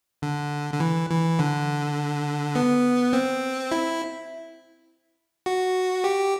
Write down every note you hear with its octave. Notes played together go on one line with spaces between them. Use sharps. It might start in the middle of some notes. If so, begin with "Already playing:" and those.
D3
D3
E3
E3
D3
B3
C4
E4
F#4
G4